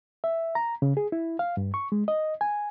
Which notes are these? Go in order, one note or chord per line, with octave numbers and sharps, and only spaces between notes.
E5
A#5
C#3
G#4
E4
F5
G2
C#6
G#3
D#5
G#5